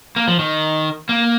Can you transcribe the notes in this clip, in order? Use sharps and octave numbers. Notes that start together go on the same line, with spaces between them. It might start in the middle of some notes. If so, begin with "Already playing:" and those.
A#3
F3
D#3
A#3